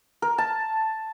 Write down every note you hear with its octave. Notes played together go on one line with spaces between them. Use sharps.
A#4
A5